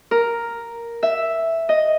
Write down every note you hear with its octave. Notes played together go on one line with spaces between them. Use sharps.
A#4
E5
D#5